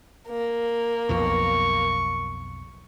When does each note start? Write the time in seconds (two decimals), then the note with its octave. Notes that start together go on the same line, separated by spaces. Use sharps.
0.28 A#3
1.09 B1 F2 B2 C#6